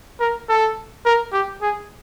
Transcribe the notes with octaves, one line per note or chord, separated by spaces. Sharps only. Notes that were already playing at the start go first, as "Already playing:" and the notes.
A#4
A4
A#4
G4
G#4